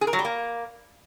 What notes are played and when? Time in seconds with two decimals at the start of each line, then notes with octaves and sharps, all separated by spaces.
0.01 G#4
0.07 A#4
0.13 F#3
0.19 G3
0.25 A#3